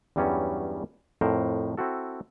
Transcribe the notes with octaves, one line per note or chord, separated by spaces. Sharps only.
E2 G2 F#3 G3 B3 C#4
F2 A2 A#4 C5
C4 E4 F#4 A4